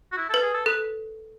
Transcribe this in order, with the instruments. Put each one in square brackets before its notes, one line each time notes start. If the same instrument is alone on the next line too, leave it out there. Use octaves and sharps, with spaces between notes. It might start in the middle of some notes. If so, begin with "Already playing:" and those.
[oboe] F#4
E4
A4
[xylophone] B4
[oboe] G#4
A4
[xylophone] A4 [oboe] B4